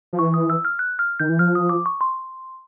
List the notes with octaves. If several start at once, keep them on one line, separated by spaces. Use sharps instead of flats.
F3
E3 C#6
D#6
E6
F6
F#6
F6
D#3 G6
E3
F3 F6
D#6
D6
C#6
C6